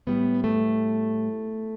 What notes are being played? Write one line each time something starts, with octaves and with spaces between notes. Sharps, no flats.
A2 G3 B3
A3